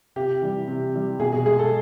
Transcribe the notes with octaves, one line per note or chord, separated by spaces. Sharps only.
C3 G4
E3 G3
C3
E3 G3
B2 G#4
G#4
G#3 G#4
A4